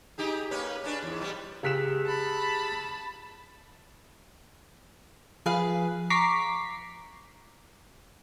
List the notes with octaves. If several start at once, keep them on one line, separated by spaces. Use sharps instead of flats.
D#4 G4 G#4
A#3 C#4 B4
C#4 D4 B4
E2 G#2
F#3 G3 B3
C#2 G4 G#4 F#6 B6 E7
A5 B5
F3 G#4 B4 F5
A#5 C#6 D6 B6 C7